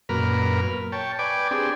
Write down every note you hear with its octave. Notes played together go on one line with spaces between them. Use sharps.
F#2 A#2 A#4 B4 F6
C#5 G5 A5
B4 D5 G5 G#5 D6
C4 D4 G4 G#4